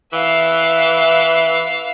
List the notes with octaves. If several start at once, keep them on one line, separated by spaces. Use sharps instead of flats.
E3 E5 F5